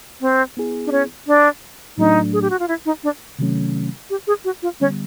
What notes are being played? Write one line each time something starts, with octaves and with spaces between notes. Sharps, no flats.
C4
B3 E4 G#4
D4
C#4
D4
A2 F#3 A3 D4 D#4
G#4
G4
F#4
F4
E4
D#4
D4
C3 D#3 F#3 A3 C#4
G4
G#4
F#4
F4
D3 G3 B3 C#4